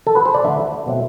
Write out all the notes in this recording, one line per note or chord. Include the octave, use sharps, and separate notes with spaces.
A4
B4
C5
D5
D3 A3 D4 E5
B2 F#3 A3 C4